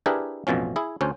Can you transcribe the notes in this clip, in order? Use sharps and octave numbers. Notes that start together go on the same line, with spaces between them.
D4 E4 G4 G#4 A#4 B4
A1 F2 B2 F3 C#4
E4 G#4
D2 C#4 C5